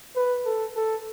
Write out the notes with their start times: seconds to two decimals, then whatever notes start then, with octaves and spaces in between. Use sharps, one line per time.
0.16 B4
0.46 A4
0.76 A4